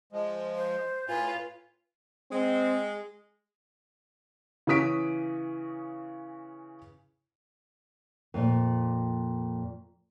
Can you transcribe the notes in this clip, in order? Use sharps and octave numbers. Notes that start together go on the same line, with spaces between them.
F3 G#3
C5
A2 F4 B4 G#5
G#3 C4
C#3 E3 C#4 D#6 B6 D7
F2 A#2